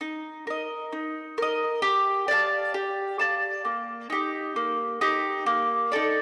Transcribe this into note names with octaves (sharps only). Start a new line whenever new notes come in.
D#4
A#4 D#5
D#4
A#4 D#5
G4
D5 F5 A5
G4
D5 F5 A5
A#3
D#4 G4
A#3
D#4 G4
A#3
D#4 A4 D5